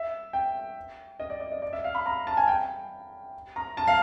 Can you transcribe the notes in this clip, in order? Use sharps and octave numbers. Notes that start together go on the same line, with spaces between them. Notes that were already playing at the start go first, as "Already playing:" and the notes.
Already playing: E5
G5
D#5
D5
D5
D#5
D5
E5
F5
B5
A#5
A5
G#5
G5
A#5
A5
F5